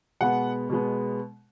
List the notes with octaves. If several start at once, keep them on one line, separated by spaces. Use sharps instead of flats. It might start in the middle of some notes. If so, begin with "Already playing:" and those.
B2 G#3 B3 F#5
B2 G#3 B3